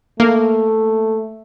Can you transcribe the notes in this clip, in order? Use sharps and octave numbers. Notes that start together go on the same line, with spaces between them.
A3 A#3